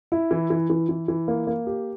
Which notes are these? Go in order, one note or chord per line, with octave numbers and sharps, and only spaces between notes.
E4
E3
E3
E3
E3
E3
A#3
A#3
G4